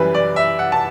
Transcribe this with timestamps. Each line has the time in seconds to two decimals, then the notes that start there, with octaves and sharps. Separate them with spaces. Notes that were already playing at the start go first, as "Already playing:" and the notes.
Already playing: F#2 E3 G3 B4
0.14 D5
0.36 E5
0.59 F#5
0.72 A5